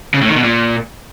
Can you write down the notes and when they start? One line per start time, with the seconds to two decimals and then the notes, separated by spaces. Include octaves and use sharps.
0.14 C#3
0.21 A2
0.29 D#3
0.36 B2
0.43 A#2